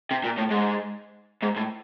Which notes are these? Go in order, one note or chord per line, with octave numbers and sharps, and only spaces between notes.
C3
A#2
A2
G#2
G#2
A2